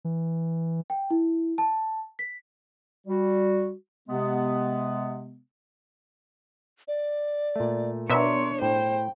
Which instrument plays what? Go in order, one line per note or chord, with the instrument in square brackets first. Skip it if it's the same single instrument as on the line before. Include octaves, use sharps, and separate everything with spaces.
[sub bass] E3
[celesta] G5
E4
A5
B6
[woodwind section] G3 F#4
C3 G#3 B3
[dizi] D5
[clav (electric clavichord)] A#2 A3
[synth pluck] B2 E5 [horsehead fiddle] D4 C#5 [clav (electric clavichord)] A#4 D5 A#5 [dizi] C6
[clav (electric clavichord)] A2 [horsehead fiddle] C5 [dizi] G5